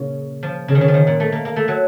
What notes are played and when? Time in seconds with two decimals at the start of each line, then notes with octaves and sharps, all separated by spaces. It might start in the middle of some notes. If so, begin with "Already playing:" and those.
Already playing: A#2 C#3
0.43 F3
0.68 C#3
0.75 D#3
0.81 C#3
0.88 F3
0.94 D#3
1.07 A#2
1.20 A3
1.32 A#3
1.45 A#3
1.56 A3
1.68 F#3